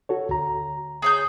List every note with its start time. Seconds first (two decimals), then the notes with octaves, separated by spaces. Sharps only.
0.09 F#4 A4 C#5
0.29 D2 A#5
1.02 G#4 C#5 G6